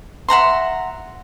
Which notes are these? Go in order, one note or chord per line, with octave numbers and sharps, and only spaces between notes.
E5 F#5 A#5 C6